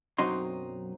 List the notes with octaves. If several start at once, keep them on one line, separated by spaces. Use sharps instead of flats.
B1 F#2 F#3 C4 D#4 C6